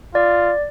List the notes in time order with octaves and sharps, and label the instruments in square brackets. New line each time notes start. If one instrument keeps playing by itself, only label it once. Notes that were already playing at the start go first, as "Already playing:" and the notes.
[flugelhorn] F4 [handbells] D5